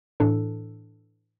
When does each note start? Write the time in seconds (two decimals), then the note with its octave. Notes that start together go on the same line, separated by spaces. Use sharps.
0.20 A2 E3 D4 A4